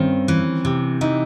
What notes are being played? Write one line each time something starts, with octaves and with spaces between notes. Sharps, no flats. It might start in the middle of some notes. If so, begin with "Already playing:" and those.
Already playing: G2 D#3 C4 C#4
E3
C3
E3 D#4